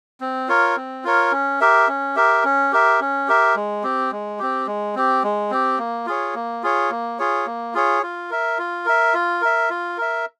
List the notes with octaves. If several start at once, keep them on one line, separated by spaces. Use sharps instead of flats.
C4
F4 A#4 C#5
C4
F4 A#4 C#5
C#4
G4 A#4 E5
C#4
G4 A#4 E5
C#4
G4 A#4 E5
C#4
G4 A#4 E5
G#3
C4 G4
G#3
C4 G4
G#3
C4 G4
G#3
C4 G4
A#3
F4 G#4 C#5
A#3
F4 G#4 C#5
A#3
F4 G#4 C#5
A#3
F4 G#4 C#5
F4
A#4 E5
F4
A#4 E5
F4
A#4 E5
F4
A#4 E5